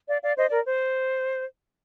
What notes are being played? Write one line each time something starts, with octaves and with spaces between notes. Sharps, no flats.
D5 F5
D5 F5
C5 D#5
A#4 D5
C5